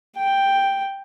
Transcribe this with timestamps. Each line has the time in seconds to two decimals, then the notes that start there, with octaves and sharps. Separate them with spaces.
0.18 G5